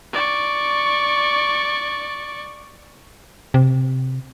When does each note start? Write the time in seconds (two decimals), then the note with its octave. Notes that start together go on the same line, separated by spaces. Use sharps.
0.13 D5 C#6
3.54 C3